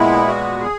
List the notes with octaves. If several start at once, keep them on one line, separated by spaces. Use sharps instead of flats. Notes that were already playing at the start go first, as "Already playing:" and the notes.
Already playing: A#2 G#3 B3 E4
F#4
G#4